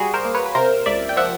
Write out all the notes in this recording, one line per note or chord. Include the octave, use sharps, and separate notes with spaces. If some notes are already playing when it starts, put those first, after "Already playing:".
Already playing: G3 F#4 G#4
A#4 C5
A#3
B4 C#5
B4
C3 A#4 C5
C#2 D5 E5
G5
F3 E5 F#5